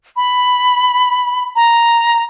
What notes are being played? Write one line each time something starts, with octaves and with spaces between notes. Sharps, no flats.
B5
A#5